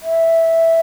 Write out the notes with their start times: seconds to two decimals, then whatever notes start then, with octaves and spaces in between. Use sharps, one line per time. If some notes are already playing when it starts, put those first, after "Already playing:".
0.02 E5